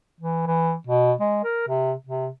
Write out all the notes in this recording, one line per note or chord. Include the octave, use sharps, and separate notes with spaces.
E3
E3
B2
G#3
A#4
C3
C3